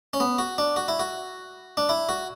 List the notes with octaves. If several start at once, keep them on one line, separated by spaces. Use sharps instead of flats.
C#4
B3
F#4
D4
F#4
E4
F#4
D4
E4
F#4